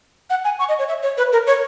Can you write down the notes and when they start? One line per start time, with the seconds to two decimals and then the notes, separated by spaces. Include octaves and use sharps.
0.30 F#5
0.45 G#5
0.59 C#6
0.69 D#5
0.79 C#5
0.88 E5
1.03 C#5
1.18 B4
1.32 A#4
1.47 C#5